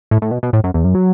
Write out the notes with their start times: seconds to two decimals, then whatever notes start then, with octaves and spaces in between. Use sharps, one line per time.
0.11 A2
0.22 A2
0.31 B2
0.43 B2
0.53 A2
0.64 F#2
0.74 E2
0.84 F#2
0.95 F#3